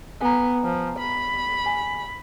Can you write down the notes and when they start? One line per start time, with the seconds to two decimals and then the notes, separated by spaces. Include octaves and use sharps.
0.21 B3 G#5 A#5
0.64 F3
0.99 B5
1.66 G#5